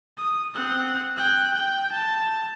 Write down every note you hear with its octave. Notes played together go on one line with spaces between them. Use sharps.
D#6
C4 F#5
G5 F#6
G5
A5